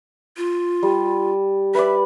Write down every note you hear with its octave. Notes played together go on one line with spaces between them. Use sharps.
F4
G3
B4 D5 E5